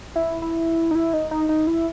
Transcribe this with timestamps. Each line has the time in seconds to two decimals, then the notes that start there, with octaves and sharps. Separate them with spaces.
0.16 E4
0.42 E4
0.91 D#4
0.95 E4
1.13 D#4
1.31 D#4
1.49 D#4
1.67 E4